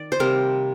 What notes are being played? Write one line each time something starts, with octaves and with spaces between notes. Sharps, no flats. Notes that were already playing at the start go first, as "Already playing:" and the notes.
Already playing: D#3 D5
C5
C3 G3 A#3 A#4